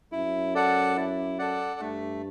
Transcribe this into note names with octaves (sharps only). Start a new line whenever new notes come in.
F#2 E4
A4 D5 F#5
E4
A4 D5 F#5
G2 A3